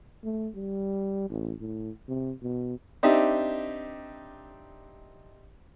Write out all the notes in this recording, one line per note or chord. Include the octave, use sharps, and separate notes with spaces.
A3
G3
A1
A2
C3
B2
C4 D4 D#4 G4 E5